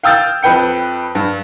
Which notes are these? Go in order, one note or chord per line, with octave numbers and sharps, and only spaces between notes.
F5 G5 D#6 E6 G6 A6
F2 B4 G5 C#7
G2